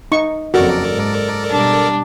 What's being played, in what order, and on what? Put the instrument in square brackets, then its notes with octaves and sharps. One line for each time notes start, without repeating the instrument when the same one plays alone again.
[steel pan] D#4 C#6
[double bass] F#1 F2 [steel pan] F#4 [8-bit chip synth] A4 A#4 D5
[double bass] G#2
[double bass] B2 G3 [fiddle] D4